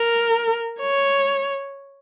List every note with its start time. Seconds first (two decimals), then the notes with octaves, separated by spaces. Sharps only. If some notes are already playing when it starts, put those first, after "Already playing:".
Already playing: A#4
0.80 C#5